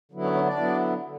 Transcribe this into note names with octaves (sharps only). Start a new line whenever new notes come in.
D3 F#3 B3 E4
C#4 C#5
C#4 C#5
D4 D5
D3 F#3 B3 E4
D3